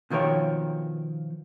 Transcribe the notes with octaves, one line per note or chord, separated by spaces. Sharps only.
B2 D#3 F3 A#4 C#5 G5